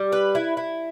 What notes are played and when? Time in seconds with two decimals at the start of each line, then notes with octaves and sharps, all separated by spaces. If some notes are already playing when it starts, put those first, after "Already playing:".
Already playing: G3
0.12 B4
0.35 E4
0.57 E4